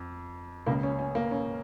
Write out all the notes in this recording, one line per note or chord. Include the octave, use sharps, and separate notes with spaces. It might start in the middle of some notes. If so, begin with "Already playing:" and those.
Already playing: F2
C#2 C#3 A#3
C#4
C#4
A#3
C#4